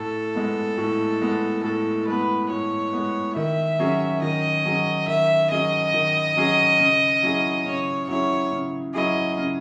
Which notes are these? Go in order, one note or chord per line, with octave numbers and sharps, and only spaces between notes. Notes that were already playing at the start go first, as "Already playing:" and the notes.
Already playing: A2 A4
G#3 B3
A2
G#3 B3
A2 A4
G#3 B3 B4
A2 C#5
G#3 B3
D#3 E5
F#3 C#4 G#4
D#3 D#5
F#3 C#4 G#4
D#3 E5
F#3 C#4 G#4 D#5
D#3
F#3 C#4 G#4
C#3
F#3 C#4 E4 G#4
C#3 C#5
F#3 C#4 E4 G#4 C#5
C#3
F#3 C#4 E4 G#4 D#5
C#3